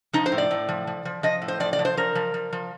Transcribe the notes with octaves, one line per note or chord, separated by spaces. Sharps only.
F3 D#4
C5
A2
D5
A2
F3
F3
F3
F3 D#5
A2
C5
F3 D5
D5
F3
C5
F3 A#4
F3
F3
F3